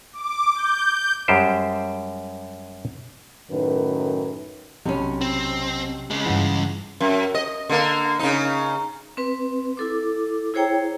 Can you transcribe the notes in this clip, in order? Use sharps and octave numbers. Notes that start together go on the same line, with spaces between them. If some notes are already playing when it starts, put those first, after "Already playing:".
D6
G6
F#2 G3 G#3 G4 C5
F#2 A2 D#3 B4
B1 C3 C#4 B5
C4
C#3 G#3
G2 E3 F#5
F#2
D#5
D3 A#3
C#3 D#4
C4 B4
E4 A4 D6
E4 G#4 C5 C#5 G5 A#5